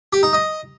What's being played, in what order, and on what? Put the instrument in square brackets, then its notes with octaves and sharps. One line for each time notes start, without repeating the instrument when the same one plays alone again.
[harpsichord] G4
D#4
D#5